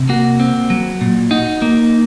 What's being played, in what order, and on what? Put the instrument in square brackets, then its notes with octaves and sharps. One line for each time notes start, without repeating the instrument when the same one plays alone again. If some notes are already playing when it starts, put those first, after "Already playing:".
Already playing: [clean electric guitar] C3
A#3 F#4
C4
F#3
A#2
D#4 F#4
A#3